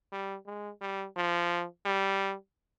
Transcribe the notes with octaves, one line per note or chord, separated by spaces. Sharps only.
G3
G#3
G3
F3
G3